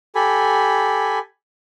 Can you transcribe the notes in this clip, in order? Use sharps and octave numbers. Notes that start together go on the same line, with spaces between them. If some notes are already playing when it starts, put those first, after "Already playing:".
G4 A4 G#5 B5